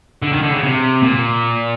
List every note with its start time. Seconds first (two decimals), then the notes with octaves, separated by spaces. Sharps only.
0.23 D3
0.33 D#3
0.42 D3
0.52 C#3
0.63 C3
1.03 A#2